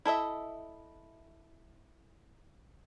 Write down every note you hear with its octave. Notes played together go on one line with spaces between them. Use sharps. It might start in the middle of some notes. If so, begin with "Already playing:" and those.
E4 A4 D#5 E5